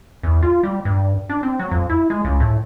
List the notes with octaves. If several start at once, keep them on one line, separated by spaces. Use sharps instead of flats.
E2
F4
G3
G2
D4
C4
F#3
F2
E4
G#3
C#2
A2